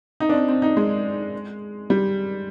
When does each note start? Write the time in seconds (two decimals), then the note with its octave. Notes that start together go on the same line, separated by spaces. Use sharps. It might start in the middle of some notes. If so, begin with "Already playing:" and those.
0.20 D#4
0.29 D4
0.34 C4
0.49 C4
0.62 D#4
0.77 G#3
1.90 G3